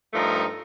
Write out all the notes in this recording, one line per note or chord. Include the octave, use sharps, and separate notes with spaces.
G2 F3 A3 D#4 A#4